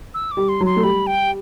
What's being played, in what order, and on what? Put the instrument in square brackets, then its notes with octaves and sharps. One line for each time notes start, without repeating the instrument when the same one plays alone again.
[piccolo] E6
D6
[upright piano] G3
[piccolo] C6
[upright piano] F#3
[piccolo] C6
[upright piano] A3
[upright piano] G3 [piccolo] B5
[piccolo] G5